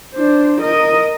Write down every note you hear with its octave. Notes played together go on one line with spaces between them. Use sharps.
D4 C5
A#4 D#5